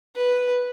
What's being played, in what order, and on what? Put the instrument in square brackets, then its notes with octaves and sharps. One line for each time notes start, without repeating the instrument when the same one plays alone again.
[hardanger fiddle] B4